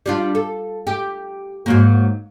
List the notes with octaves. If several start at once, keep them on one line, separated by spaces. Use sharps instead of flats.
G3 D4 F4
A4
G4
G#2 F#3 A#3